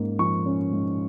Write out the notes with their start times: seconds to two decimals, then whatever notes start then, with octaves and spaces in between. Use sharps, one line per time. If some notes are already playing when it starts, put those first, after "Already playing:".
Already playing: G#2 A#3 C#4
0.19 F3 C#6
0.46 C#4
0.73 G#2